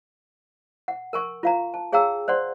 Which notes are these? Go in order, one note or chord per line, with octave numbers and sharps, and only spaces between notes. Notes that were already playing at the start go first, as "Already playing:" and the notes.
F#5
A#4 G#5 C#6
F4 F5 A#5
A5
G#4 C#5 F5 G5 A#5 E6
C5 D5 F#5 C6